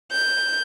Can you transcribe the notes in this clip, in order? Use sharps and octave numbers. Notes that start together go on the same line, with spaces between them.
G6